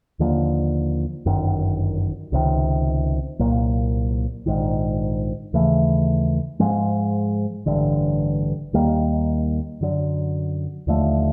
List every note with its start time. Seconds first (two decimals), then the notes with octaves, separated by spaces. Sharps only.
0.19 D#2 D3 F3 A#3
1.26 G1 F#2 D#3
2.32 C#2 C3 D#3
3.39 C2 A#2 F#3 A#3
4.46 A#1 G#2 D#3
5.53 D#2 C#3 E3 A3
6.60 G#2 F3 G#3
7.66 A1 G2 D3
8.73 D#2 D#3 G3 A#3
9.81 F#2 D3 F#3
10.87 D#2 D3 F3 A3